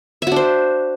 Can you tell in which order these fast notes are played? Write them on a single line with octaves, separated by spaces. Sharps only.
E5 F#4 D4 C5